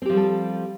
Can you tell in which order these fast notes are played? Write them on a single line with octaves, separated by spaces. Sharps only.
C4 G4 F3 G3 A4